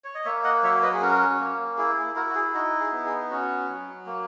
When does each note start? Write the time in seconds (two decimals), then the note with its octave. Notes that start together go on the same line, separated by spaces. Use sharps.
0.04 C#5
0.15 D#5
0.25 A#3 C#5 E5
0.44 D#5 F#5
0.63 F#3 C#5 E5
0.83 B4 D#5
0.94 G#4
1.02 C#4 F#4 A#4
1.40 A#3
1.77 E4 G#4
1.97 G#4
2.16 E4 F#4 A#4
2.29 F#4
2.35 G#4
2.54 D#4 F#4
2.80 G#4
2.92 B3
3.05 G#4
3.30 C#4 F#4
3.69 F#3
4.06 A#3